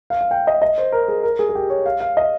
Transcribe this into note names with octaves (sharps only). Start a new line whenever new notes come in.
F5
F5
G5
D#5
D#5
C5
A#4
G#4
A#4
G#4
G#4
G4
C#5
F5
F5
D#5